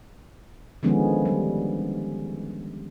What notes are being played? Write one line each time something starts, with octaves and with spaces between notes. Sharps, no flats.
D3 D#3 F3 G#3 B3 C#4
G3